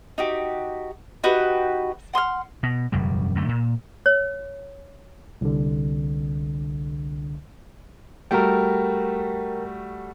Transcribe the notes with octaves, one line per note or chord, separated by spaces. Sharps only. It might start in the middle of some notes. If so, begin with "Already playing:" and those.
D#4 F#4 G4
D#4 F#4 G4 B4
F#5 C6 D#6 F6
B2
E1 F#2 C#3 G3
F#2 D3 A3
A#2
C#5
C2 D3
G3 A3 F#4 A#4 G5